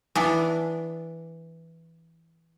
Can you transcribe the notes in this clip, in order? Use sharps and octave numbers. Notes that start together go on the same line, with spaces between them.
E3 B3 D4